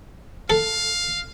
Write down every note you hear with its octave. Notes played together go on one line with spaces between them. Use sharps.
A4 F5